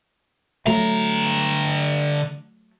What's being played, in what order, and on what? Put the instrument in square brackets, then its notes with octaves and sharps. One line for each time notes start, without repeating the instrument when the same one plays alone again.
[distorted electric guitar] D3 A#5 [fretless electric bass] F#3 A3